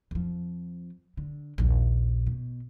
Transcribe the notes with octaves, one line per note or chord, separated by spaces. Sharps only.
F2 F3
D3
A#1 D#2
B2